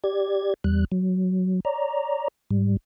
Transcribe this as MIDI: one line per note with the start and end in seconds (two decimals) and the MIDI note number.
0.04 0.54 67
0.04 0.54 74
0.04 0.54 92
0.64 0.85 40
0.64 0.85 55
0.64 0.85 90
0.92 1.60 54
1.65 2.28 73
1.65 2.28 74
1.65 2.28 82
2.51 2.77 44
2.51 2.77 55